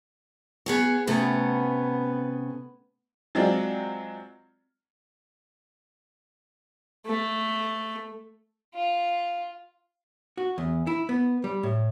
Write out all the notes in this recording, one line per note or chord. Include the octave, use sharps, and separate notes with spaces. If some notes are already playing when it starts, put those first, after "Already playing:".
B3 G#4 C#5
C3 A3 B3 C#4
F#3 G#3 C4 F4 D5
A3
F4
F#4
E2
E4
B3
G3
A2